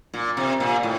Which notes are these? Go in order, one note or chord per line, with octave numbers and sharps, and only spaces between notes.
A#2
C3
A#2
A2